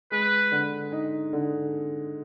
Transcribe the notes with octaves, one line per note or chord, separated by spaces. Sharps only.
G#3 B4
D3
D#4
D3